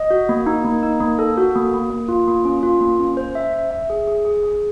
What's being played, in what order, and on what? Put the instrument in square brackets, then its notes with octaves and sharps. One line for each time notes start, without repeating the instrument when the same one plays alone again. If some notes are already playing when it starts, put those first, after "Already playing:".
Already playing: [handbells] D#5
F#4
A#3
D#4
A#3
D#4
A#3
A4
F#4
A#3
A#3
A#3
F4
A#3
C#4
F4
A#3
C#4
C5
E5
E5
E5
G#4
G#4
G#4
G#4